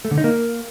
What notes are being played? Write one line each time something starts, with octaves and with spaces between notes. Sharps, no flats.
A3
D3
D#4
A#3